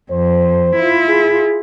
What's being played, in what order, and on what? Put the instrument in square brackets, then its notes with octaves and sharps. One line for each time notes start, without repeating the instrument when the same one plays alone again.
[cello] F2 [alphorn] C5
[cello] E4 F4
[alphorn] G#4